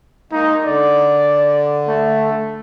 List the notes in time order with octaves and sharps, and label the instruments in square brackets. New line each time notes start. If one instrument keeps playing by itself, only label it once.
[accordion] G#3 A#3 [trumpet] D#4
[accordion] D3 [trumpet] D5
[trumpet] A3